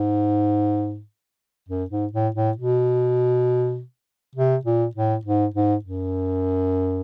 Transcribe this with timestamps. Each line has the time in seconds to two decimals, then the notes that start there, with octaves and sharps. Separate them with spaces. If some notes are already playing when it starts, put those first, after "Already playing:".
Already playing: G#2
1.69 F#2
1.91 G#2
2.13 A2
2.35 A2
2.57 B2
4.36 C3
4.65 A#2
4.96 A2
5.25 G#2
5.54 G#2
5.85 F#2